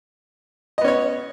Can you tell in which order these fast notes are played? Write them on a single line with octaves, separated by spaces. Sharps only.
D#5 B3 C#4 C#5